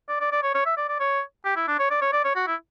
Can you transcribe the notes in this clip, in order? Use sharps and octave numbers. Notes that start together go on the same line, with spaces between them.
D5
D5
D5
C#5
C#5
E5
D5
D5
C#5
G4
E4
D4
C#5
D5
C#5
D5
C#5
F#4
E4